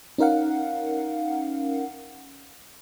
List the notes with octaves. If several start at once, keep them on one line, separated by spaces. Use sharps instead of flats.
C#4 D#4 A#4 F5 F#5